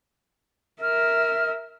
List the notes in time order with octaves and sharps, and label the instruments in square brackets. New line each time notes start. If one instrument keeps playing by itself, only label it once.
[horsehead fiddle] A#4 E5 [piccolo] F6